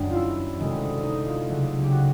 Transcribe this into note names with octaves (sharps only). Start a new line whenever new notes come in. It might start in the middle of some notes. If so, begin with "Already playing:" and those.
Already playing: F#2 D#3 G3 D4
F4
E4
D2 C3 D#3 G#3
D#4
F4
C#2 C#3 F#3 A3
G4
F#4